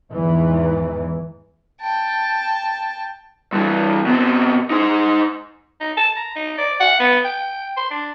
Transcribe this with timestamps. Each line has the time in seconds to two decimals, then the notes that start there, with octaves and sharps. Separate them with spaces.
0.12 E2 G#2 E3
1.82 G5 A5
3.53 G2 E3
4.06 B2 C4
4.70 D#4 C5
5.80 D#4
5.97 A5
6.16 A#5
6.36 D#4
6.58 D5
6.80 F#5
7.00 B3
7.25 G5
7.77 C6
7.91 D4